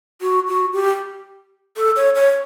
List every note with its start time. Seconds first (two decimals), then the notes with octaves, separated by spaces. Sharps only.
0.22 F#4
0.48 F#4
0.73 G4
1.77 A4
1.96 C#5
2.15 C#5